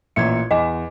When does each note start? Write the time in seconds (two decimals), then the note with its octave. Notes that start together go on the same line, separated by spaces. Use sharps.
0.16 A1 A#2 E5 G#6 C#7
0.51 E2 D#5 G#5 D6